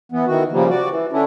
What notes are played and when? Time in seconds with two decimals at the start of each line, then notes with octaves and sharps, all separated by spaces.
0.12 E3 B3
0.27 D#3 E3 F#4
0.52 C#3 F3 G3 A#3
0.69 F#4 D5
0.90 E3
1.12 D3 C#4 D4 E4